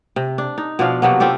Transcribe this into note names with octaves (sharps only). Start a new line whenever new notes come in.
C3
D4
D#4
B2 F3 D4 F5
C3 F#3 A#3 B3
C4 F4 G4 A4